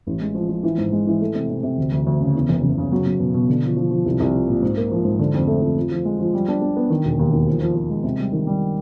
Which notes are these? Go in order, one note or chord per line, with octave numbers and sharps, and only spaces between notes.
A1
G#3
F3
F3
E3
G#2
G#3
E3
A3
C3
C3
C3
D2
D2
D2
C#3
E2
F#1
F#1
C#3
F#3
F#3
B2
B2
D3
F3
F3
F3
C2
C2
F3
A#2
G#2
A#3
F3
G#2
D3
F2
A3
F2
F3
F3
G#3
F3
G3
D4
D4
B3
D#3
E1
D#2
D#3
F3
F3
F3
G#3
C3
G3
D#3
G3